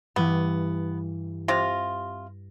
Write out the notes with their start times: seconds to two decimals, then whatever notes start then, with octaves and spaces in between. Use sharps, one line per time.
0.16 G2 E3 G3 B3
1.48 C3 F4 F6 A#6